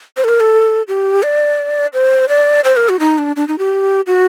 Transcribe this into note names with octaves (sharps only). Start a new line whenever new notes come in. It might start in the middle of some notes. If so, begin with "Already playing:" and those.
C5
A4
A#4
A4
G4
D5
C5
D5
C5
A#4
F#4
D#4
D4
D4
D#4
G4
F#4